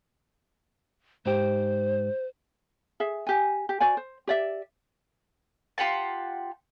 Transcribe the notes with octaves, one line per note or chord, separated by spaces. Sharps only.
G#2 G4 C5
G#4 E5
G4 G#5
G4
F#4 C5 D5 G#5
C5
G4 D5 E5
F4 G4 F#5 A5